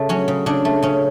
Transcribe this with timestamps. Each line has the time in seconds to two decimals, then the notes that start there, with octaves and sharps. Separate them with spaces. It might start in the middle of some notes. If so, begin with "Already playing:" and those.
Already playing: C#3 A3
0.09 F#3 C#4
0.28 C#3
0.46 C#3 D4
0.65 A3
0.82 C#3 C#4